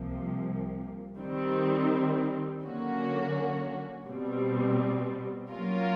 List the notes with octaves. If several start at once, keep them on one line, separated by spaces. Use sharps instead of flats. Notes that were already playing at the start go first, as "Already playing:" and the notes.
Already playing: C2 C3 F3 A#3
D#3 G3 C4
D3 F#3 A#3 C#4 F#4
B2 G3 C4
F#3 A#3 C#4 F4 A#4